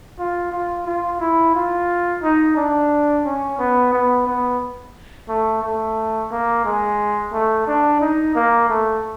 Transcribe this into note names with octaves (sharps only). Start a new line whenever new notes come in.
F4
F4
F4
E4
F4
D#4
D4
C#4
B3
B3
B3
A3
A3
A#3
G#3
A3
D4
D#4
A#3
A3